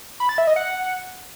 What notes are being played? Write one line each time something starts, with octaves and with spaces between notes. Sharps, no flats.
B5
A6
E5
D#5
F#5